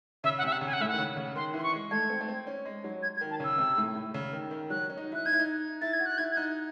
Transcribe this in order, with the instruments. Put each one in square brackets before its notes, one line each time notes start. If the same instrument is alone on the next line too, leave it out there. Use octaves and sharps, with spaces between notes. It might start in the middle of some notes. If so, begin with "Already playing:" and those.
[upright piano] C#3 [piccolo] E5
[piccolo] F#5
[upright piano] C3 [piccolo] E5
[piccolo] F#5
[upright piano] C#3 [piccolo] G#5
[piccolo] F#5
[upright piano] A2 [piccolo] E5
[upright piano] D#3 [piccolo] F#5
[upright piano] C#3
C#3
[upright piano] D#3 [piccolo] C6
[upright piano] E3 [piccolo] C6
[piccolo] C#6
[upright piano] G#3
[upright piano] A3 [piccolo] G#6
[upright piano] C4
A3
C4
C#4
G#3
F#3
[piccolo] G#6
G#6
[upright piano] D#3
[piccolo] A5
[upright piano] C#3 [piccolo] E6
[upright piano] C3
A2
A2
C#3
D#3
D#3
[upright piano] F#3 [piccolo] F#6
[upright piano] C#4
D#4
[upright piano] E4 [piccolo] F#6
[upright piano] D#4 [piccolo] G#6
[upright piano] E4
D#4
[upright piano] E4 [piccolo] A6
[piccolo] G#6
[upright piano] F#4
[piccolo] F#6
[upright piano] E4 [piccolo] G#6
[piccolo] G#6
[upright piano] D#4 [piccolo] F#6